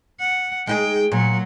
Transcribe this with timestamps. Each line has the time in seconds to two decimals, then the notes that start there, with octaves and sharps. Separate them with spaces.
0.20 F#5
0.67 G#3 D#4 G#4 G5
1.12 A#2 F#3